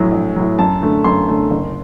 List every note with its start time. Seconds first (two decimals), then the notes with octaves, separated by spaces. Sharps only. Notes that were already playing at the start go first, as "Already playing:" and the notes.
Already playing: A#1 A2 F#3
0.12 A#1
0.36 A2 F#3
0.59 F#2 A5
0.81 D3 A3
1.04 F#2 C6
1.28 D3 A3
1.51 F#1